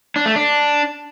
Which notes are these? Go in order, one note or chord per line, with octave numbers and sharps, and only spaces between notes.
D4
A3
D4